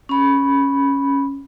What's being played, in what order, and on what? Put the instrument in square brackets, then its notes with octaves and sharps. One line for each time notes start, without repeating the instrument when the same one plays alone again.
[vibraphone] C#4 B5